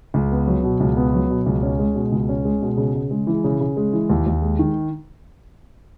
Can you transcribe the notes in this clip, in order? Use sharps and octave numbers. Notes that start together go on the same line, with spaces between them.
C#2
B3
F#3
B2
C#2
B3
F#3
B2
C#2
C#4
G#3
B2
C#2
C#4
G#3
B2
C#3
C#3
G#3
E3
C#3
C#3
G#3
E3
D#2
D#2
G#3
D#3